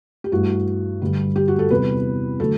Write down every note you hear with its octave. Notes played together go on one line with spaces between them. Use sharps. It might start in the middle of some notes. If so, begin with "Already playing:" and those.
G4
G2 E3 A3 F#4
G2 D3 G3
G4
F#4
A4
E2 C3 G3 B4
D3 F#3 A3 A4